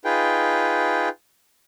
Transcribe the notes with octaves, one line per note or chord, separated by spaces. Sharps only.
D#4 F4 G#4 B4 G5